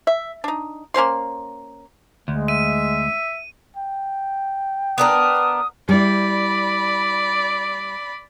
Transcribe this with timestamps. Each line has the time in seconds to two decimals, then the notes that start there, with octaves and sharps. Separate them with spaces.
0.07 E5
0.44 D4 D#4
0.94 A#3 C#4 C5 C6
2.28 D2 G#3
2.48 E5 D#7
3.77 G5
4.98 B3 D4 A#4 D#6
5.89 G3 E4 D5 B5